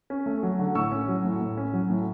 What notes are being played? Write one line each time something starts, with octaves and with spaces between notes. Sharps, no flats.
C#4
A3
F#3
D3
A2 C#6 E6
C#4
F#3
A2
A2
C#4
F#3
A2